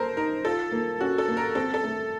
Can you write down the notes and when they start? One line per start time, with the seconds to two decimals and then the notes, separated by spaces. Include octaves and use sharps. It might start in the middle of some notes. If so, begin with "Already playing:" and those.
Already playing: A#3 A4 A#4 C5
0.17 D#4 A#4
0.45 F4 A4
0.72 A#3
1.00 C#4 F#4
1.18 A4
1.28 A#3
1.37 A#4
1.55 C4 A4
1.74 A4
1.83 A3